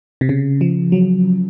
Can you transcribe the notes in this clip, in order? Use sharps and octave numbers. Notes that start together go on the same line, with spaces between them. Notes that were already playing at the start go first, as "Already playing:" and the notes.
C3
C#3
F3
F#3